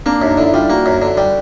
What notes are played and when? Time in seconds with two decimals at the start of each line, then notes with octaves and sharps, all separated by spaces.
0.06 A#3 D4
0.22 F#2 D#4
0.37 D3 E4
0.53 G3 F4
0.70 A#3 F#4
0.86 F#2
1.02 D3
1.17 G3